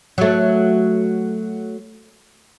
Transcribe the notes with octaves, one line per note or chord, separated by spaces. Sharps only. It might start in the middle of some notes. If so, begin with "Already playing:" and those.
F#3 A3